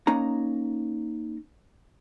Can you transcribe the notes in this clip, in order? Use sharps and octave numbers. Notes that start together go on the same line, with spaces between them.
A#3 C#4 D#4 A#5